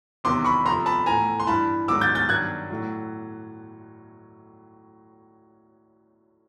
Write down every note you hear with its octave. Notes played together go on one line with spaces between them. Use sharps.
E2 C3 D#3 F#3 C6 D6
B5 C#6
F2 C3 F3 A#5 C6
A5 B5
A2 E3 G#5 A#5
C6
G2 E3 A5 B5
G#2 D#3 F#3 D6 E6
G6 A6
G6 A6
G2 D#3 F#3 F#6 G#6
A2 F#3